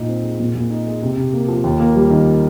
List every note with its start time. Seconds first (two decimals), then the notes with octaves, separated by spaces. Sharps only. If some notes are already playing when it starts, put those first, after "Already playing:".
Already playing: A#2 D#4
0.09 C4
0.23 G#3
0.40 A#2
0.55 A#2
0.70 D#4
0.87 G#3
1.02 C3
1.17 C3
1.33 A#3
1.48 F3
1.64 D#2
1.80 A#3
1.96 G3
2.10 D#3